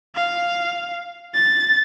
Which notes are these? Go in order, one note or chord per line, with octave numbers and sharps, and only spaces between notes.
F5
A6